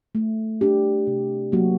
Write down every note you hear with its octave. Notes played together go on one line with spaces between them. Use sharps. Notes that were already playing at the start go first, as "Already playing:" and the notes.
A3
D4 G4
C3
F#3 A#3 F#4